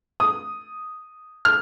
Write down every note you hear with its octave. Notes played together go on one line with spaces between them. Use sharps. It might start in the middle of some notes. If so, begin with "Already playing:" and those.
D#6
F6